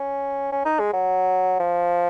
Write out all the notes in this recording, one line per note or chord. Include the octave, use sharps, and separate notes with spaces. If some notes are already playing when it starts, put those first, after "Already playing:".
Already playing: C#4
C#4
D#4
G#3
F#3
F3